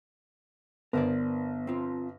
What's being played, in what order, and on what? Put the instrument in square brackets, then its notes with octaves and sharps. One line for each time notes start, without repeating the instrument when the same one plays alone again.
[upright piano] G1 [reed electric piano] B3 [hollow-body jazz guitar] A#4 C5 D5
[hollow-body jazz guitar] C4 F4